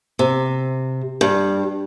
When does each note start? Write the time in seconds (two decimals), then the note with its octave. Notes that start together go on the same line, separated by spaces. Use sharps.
0.19 C3
1.21 G2